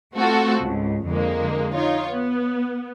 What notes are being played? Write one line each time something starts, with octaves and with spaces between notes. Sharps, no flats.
A3 C4 F4 F#4 A4
C#2 G#2
F2 D3 G#3 A#3
D#4 F4 C#5
B3